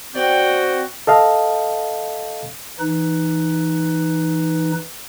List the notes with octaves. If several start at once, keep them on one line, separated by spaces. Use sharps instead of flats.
C4 F#4 D5 G5
A4 D#5 F5
E3 D#4 B4